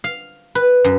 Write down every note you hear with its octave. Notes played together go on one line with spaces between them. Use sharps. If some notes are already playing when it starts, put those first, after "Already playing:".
F5
B4
F#2